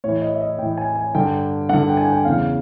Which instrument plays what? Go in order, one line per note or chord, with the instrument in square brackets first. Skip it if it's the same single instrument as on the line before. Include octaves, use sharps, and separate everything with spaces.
[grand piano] A2 E3 C#5
D#5
E5
D#5
A2 E3 G5
G#5
G#5
G2 D3 G5
G2 D3 F#5
G5
G#5
G5
E2 C#3 E3 F5